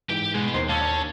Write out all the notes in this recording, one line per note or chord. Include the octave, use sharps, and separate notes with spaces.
G#2 E3 E4 G4 G5
B2 G#3
D#2 D#4 A#4 C5
C#4 F5 A5 D6 E6
D4